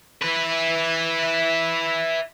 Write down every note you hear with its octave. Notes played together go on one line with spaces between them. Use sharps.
E4 B4